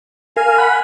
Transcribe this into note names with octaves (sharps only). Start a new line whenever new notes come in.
A#4 F5 G#5
F#5 B5